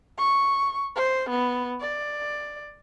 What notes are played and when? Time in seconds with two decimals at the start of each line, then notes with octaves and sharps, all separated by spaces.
0.18 C#6
0.96 C5
1.30 B3
1.81 D5